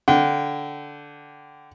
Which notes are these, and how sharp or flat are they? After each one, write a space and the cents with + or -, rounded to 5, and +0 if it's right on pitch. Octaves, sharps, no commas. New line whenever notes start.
D3 -10 G5 -30